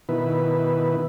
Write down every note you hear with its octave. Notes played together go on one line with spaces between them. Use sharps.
B2 D#3 E4 B4